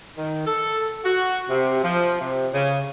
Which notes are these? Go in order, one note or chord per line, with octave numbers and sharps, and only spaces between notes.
D#3
A4
F#4
C3
F3
C3
C#3